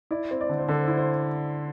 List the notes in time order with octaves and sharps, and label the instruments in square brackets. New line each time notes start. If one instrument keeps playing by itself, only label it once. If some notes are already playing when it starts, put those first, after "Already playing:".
[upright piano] E4 [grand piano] D5
[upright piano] C4
[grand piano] D5
[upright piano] D3
[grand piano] C5
[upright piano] D3 [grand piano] A4
[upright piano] E4 [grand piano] C5
[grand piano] C5